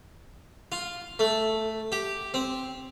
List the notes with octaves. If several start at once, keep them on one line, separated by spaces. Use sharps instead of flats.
F4
A3
G4
C4